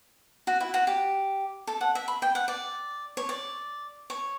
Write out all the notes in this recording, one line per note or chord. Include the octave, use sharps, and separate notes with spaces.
F#4
E4
F#4
G4
A4
F#5
E5
B5
G5
F#5
D5
C#5
D5
C#5